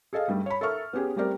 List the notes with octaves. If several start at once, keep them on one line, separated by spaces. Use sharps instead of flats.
G#4 A4 D#5 F5
G2 G3 A3
C#5 B5
A4 A#4 E5 C#6 F6
B3 C#4 G4 G#4
G3 A3 C4 G4 A#4 D5